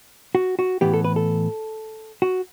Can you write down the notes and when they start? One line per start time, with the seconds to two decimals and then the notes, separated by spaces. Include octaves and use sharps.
0.35 F#4
0.59 F#4
0.81 A2 E3 B3 G4
0.94 A4
1.04 B4
1.16 A4
2.22 F#4